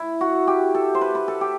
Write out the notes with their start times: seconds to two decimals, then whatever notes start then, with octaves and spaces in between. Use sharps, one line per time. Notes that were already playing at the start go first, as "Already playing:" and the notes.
Already playing: E4
0.21 F#4
0.47 G4
0.75 A4
0.95 C5
1.01 B4
1.15 B4
1.28 A4
1.41 G4